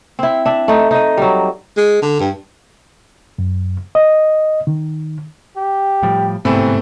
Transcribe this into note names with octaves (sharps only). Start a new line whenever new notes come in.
C4 E4
D4 E5
A3 D#4
D#4 D#5
F#3 G3
G#3
D3
G2
F#2
D#5
D#3
G4
A2 F3 G3
G1 G#2 C3 E3 A3 B3 C4